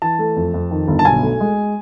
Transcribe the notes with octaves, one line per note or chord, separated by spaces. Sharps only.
E3 A5
A3
F2
F2
D#3
G1
A5
B1 G#5
A3
G#3